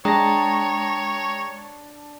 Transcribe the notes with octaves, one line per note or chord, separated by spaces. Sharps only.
G#3 D4 C#5 G5 A5 A#5 D#6 A#6